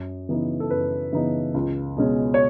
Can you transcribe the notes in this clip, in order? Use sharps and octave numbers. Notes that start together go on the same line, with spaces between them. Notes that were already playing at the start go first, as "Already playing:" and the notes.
Already playing: F#2
C#3 E3 B3 D#4
A4
F#2 B4
C#3 E3 B3 D#4
C#2
B2 G#3 C#4
C#5